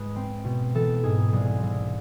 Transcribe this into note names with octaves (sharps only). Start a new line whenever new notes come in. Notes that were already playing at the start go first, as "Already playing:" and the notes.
Already playing: G#2 G#3 B4
C4
B2
E3 A4
G#2 G#4
C2 G#4
C2